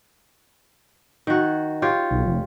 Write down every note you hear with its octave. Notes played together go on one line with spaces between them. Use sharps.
D#3 F#4
F4 G4 C#5
B1
F1